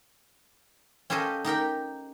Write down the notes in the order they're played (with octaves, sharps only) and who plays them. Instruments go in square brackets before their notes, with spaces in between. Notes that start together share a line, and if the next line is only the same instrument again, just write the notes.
[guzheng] C#4 G4 A4 C5 D#5 F5
D#4 G4 A#4 G5